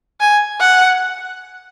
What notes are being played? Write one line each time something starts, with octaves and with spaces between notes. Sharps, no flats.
G#5
F#5